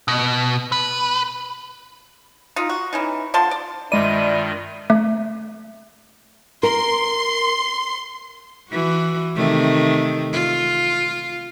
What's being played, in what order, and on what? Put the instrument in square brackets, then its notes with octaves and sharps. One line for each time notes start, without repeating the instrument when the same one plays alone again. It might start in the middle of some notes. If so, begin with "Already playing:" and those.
[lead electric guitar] B2
B4
[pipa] D#4 F4
F#4
E3 C#4 D#4
D3 F3 A5 C6
D5
[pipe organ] G2 D#3 F4 [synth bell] G#3 D#7 [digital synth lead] D5 [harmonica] E5 B5
[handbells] A3
[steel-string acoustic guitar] A#4 [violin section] C6
[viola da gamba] E3 F#4
C3 D#3 A3
F4